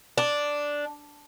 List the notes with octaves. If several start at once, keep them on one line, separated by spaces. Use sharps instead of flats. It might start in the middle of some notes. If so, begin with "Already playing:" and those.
D4